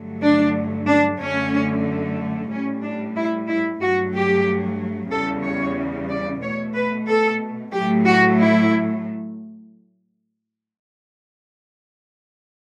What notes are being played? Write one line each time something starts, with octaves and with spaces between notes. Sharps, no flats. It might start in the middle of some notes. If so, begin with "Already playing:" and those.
Already playing: G2 D3 F#3 A3
D4
D4
F#2 D3 A3 C#4
A2 G3 C#4
D4
E4
E4
G2 F#3 A3 F#4
G4
E2 C#3 G3 A4
C#5
D5
B2 A3 C#5
B4
A4
A2 F#3 A3 G4
F#4
E4